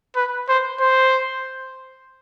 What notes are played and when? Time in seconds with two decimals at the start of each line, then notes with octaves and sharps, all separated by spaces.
0.16 B4
0.49 C5
0.80 C5